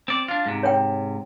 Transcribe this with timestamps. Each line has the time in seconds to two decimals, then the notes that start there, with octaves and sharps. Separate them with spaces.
0.08 C4 D5
0.28 D4 F4
0.46 G#2 C3
0.63 C#5 G5